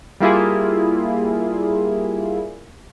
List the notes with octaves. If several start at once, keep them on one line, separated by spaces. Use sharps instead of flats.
G3 A#3 E4 F4 G#4